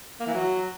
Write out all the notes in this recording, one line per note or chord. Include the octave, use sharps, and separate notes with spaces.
A#3
E3
F#3